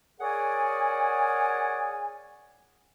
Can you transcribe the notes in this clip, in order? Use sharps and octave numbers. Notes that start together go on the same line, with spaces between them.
G#4 A#4 C#5 D5 F#5 G#5